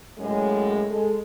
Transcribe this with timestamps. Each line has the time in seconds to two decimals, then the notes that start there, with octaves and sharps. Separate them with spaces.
0.18 F#2 A2 G#3
0.90 G#3 A4